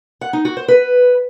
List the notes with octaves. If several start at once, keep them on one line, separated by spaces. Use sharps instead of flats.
F#5
D#4
F#4
C5
B4